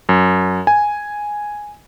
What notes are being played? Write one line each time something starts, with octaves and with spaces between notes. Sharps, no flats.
F#2
G#5